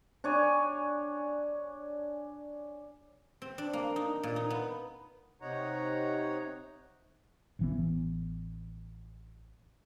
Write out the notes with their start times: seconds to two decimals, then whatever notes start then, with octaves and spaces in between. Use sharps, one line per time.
0.24 D4 C#5 G#5
3.42 C4
3.58 D4
3.73 A#3
3.96 D#4
4.23 A#2
4.36 D#4
4.50 B3
5.41 C3 D#4 C#5 F#5 A#5
7.59 A1 E3 B3